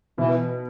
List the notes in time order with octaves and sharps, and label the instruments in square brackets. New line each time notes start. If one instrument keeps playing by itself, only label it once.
[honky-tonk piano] B2 [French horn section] E3